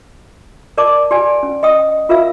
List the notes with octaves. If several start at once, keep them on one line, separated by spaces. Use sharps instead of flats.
A#4 D5 A5 D6
G4 D5 G#5
C#4
D#5 G5 D#6
F4 A#4 E5 F5 E6